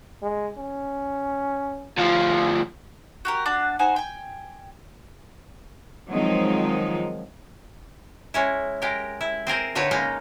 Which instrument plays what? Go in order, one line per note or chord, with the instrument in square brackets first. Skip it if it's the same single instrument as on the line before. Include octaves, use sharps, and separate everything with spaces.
[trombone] G#3
C#4
[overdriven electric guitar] D2 F3 [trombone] F4
[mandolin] F#4 G4 A#4
D4 F#4 A5
D#4 F#4 C5 G#5
G5 G#5
[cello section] D#3 F3 F#3 G#3 C4 D#4
[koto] G#3 C#4 E4
G#3 G4 A#4
E4
C4 G#4 A#4 C5
A2 D3 D#4 B4 C#5 F#5
C#3 G#3 A#3 D#4